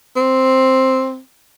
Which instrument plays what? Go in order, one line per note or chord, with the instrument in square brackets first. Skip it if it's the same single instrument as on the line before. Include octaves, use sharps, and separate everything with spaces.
[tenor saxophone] C4